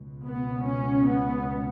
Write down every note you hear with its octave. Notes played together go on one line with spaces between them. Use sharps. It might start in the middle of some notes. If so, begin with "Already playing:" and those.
Already playing: C#2 B2
B3
C#4
B3